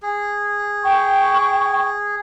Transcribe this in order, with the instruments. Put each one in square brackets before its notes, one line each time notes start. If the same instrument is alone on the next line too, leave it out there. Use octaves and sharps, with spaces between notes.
[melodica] G#4
[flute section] G5 C#6